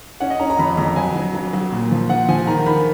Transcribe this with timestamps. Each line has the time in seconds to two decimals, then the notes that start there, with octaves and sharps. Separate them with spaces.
0.20 C#4 F#5
0.30 D#5
0.40 C#4 A#5
0.50 A#5
0.59 F2 B5
0.77 F2 A#5
0.96 F#3 G#5
1.16 F#3
1.35 F#3
1.53 F#3
1.72 A#2
1.91 F3
2.09 F3 F#5
2.28 F3 G#5
2.47 D#3 A#5
2.66 D#3 B5